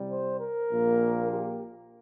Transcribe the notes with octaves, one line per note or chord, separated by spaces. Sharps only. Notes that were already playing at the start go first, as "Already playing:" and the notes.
Already playing: C2 C3 G3
C5
A#4
A#1 A#2 A#3
G4